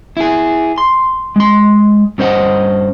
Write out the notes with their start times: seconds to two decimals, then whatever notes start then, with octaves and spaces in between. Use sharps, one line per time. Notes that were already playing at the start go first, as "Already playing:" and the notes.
0.17 E4 G#4
0.78 C6
1.36 G#3 C6
2.18 G2 C#4 C5 D#5 F#5